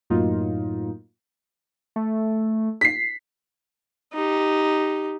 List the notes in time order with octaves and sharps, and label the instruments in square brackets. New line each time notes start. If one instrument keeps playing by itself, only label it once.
[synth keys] F#2 A2 F#3 A#3 D#4 F4
[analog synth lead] A3
[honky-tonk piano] B6 C7
[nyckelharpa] D#4 G4